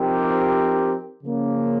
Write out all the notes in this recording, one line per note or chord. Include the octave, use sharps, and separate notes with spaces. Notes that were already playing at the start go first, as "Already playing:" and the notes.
Already playing: F3 C4 D#4 G4 A#4
C#3 F3 A#3 C#4